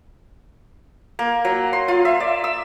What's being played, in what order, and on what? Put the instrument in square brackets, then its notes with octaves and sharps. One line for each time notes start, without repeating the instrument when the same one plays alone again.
[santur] A#3
F#3
C6
F4
E5
D5
E6